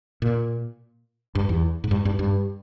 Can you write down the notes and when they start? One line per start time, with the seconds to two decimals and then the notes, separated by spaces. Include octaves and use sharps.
0.22 A#2
1.35 G2
1.49 E2
1.84 G#2
1.91 G2
2.05 G2
2.19 G2